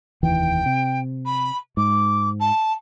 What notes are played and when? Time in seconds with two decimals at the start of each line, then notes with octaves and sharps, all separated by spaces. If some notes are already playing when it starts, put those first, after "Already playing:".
0.23 F1 D#2 E3 G5
0.66 C3
1.26 B5
1.77 G#2 D6
2.40 A5